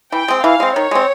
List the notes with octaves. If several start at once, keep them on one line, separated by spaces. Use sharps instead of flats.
E3 G5
G#3 C4
E3 F5
G#3 C4
D#3 C#5
G#3 C4